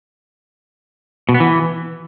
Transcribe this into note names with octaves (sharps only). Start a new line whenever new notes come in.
B2
B3
E3